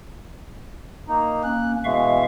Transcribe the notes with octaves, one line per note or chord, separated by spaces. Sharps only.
A#3 D#4
A#3 C#4 F#6
B2 E3 G#3 E5 F5 C#6